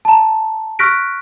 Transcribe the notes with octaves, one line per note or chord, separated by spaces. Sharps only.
A5 A#5
C#6 F6 F#6 A#6 B6 D7